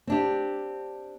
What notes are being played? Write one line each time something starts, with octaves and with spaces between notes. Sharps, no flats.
C4 D4 G4